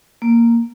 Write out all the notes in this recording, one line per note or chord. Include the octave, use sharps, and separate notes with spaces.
A#3